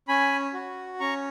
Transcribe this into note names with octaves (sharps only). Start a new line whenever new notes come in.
C#4 G#5 B5
F#4
C#4 A#5 C#6